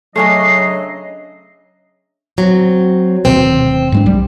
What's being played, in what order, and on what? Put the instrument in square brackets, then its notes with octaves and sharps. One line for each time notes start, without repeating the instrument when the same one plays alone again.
[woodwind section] C#3 F#3 D#5 [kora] A3 C#4 D4 [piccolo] C7
[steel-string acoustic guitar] F#3 C4
[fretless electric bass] D1 B2 D#3 [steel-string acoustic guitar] C4
[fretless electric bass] G#2 G#3 D4
B1 G3